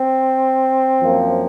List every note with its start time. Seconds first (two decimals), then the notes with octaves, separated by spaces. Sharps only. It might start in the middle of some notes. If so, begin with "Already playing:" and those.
Already playing: C4
1.00 F#2 F3 A#3